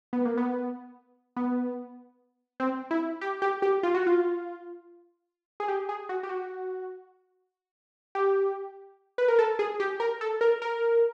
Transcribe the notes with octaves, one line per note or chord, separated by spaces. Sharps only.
B3
A#3
B3
B3
C4
E4
G4
G4
G4
F4
F#4
F4
G#4
G4
G#4
F#4
G4
F#4
G4
B4
A#4
A4
G#4
G4
A#4
A4
A#4
A#4